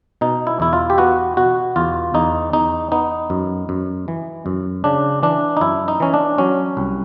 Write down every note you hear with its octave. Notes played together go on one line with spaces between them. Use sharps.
B2 D#4
E4
E2 E4
F4
G4
B3 F#4
B2 F#4
E2 F4
E2 D#4
E2 D#4
B3 D#4
F#2
F#2
E3
F#2
C#3 D4
E3 D4
D#4
F#2 E4
D#4
E3 C#4
D4
F#3 C#4
C2